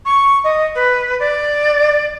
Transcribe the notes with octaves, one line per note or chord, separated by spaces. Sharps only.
C#6
D#5
B4
D5